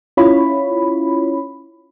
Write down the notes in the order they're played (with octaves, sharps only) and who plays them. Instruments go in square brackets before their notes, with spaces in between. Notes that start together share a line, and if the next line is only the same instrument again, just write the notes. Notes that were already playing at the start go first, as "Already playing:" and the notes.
[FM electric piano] C#4 E4 F4 C#5 B5